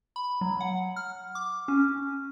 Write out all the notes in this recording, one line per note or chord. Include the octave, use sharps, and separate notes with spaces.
B5
F#3
F#5
F6
D6
C#4